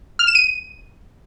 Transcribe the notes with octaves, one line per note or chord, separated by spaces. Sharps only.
F6
E7
D#7